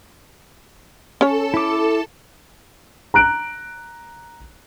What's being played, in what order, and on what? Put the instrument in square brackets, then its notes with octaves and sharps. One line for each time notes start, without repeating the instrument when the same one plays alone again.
[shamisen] C#4 C#5 [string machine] A4 A5
[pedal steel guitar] E4 D6
[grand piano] A#5 F#6 D7